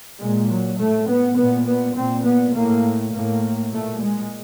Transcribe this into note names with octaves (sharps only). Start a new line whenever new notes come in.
A#2 G#3
F#3
A2 A3
B3
A#2 B3
B3
A#2 C4
B3
A2 A#3
A2 A#3
A#2 A3
G#3